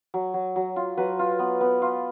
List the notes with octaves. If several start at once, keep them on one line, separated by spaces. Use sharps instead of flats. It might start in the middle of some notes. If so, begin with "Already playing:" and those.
F#3
F#3
F#3
F4
F#3 B4
F4
B3
B3
F4